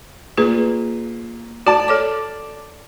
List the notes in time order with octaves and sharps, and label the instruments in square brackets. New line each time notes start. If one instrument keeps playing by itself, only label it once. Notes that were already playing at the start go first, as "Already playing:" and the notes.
[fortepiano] A#2 [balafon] G#4 B4
[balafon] F#4 [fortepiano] D5 A5
[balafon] A4 C#5 D6